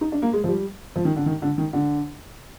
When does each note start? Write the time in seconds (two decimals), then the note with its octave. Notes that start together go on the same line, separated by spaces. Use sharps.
0.01 D#4
0.12 D4
0.22 A#3
0.33 G#3
0.44 F3
0.48 G3
0.96 F3
1.05 D#3
1.16 D3
1.26 D#3
1.42 D3
1.58 D#3
1.73 D3